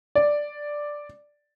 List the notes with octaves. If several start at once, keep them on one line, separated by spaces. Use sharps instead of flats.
D5